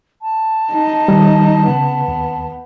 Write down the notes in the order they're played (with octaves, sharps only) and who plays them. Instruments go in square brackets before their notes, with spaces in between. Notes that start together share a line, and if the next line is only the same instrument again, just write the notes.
[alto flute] A5
[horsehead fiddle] D#4
[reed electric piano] D#3 G3
[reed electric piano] C#3 [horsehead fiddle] B3
[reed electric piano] D#2